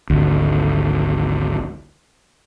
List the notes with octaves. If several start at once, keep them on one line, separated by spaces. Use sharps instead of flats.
G#1 D2